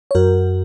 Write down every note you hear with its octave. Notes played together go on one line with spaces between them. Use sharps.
C#5
F#2 F#4 A#4